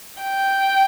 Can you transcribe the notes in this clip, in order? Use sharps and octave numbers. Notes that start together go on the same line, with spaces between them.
G5